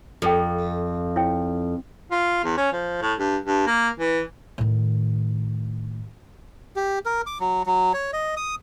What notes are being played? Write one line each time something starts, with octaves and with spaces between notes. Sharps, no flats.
F2 G#4 A4 G5
E4 C#5 G5
F4
E2
C#4
F3
A2
G2
G2
A#3
E3
A2 D#3
G4
A#4
D6
F#3
F#3
C#5
D#5
D#6